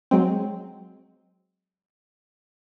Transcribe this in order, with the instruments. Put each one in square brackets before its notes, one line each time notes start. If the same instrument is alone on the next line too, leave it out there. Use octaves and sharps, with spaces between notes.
[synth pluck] F#3 G#3 C4